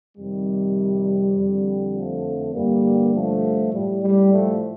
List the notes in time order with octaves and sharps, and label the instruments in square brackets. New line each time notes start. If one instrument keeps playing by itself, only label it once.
[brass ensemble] F2 C3 D#3 G3
F2 D3
F3 A3
G2 D3 G3 A#3
F3 A3
A2 G3
G3
F3 A3